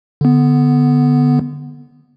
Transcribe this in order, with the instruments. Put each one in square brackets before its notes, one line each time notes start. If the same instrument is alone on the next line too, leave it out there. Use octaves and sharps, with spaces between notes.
[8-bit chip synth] D3 B3